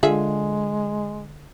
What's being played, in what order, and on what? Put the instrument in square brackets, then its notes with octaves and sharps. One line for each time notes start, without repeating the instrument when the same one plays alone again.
[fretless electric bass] D3 [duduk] G#3 [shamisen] F4 G#4 E5